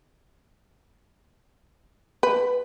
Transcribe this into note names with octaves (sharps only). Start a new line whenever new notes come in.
B4